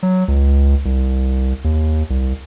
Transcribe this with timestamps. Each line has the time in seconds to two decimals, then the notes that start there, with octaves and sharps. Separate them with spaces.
0.03 F#3
0.28 C#2
0.85 C2
1.64 D#2
2.10 C2